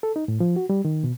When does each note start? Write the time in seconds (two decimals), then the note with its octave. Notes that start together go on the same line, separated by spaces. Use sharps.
0.03 A4
0.16 D#4
0.28 A2
0.40 F3
0.56 F#4
0.70 G3
0.85 D#3
1.04 B2